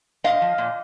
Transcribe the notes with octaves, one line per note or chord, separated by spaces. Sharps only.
A#2 D#5 F5
F3
A#2